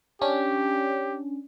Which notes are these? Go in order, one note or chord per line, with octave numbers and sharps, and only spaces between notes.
C#4 D4 G4